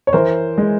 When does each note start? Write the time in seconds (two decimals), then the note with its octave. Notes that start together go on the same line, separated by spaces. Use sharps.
0.07 C#5
0.13 E3 A#4 C5
0.58 G#3